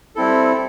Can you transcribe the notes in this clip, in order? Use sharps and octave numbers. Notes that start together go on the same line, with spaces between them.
G3 C4 E4 A4